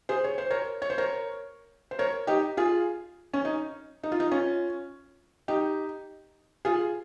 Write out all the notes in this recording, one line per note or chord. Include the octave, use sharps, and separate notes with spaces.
G#4 C5
C#5
C5
A#4 C#5
C#5
C5
A#4 C#5
C5
A#4 C#5
D#4 G4
F4 G#4
C#4
D#4
D#4
F4
D#4
C#4 F4
D#4 G4
F4 G#4